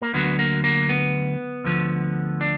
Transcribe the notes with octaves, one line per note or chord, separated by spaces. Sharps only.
A#3
D2 D3 F#3 B3
A#3
A#3
B3
D2 D3 F3
D4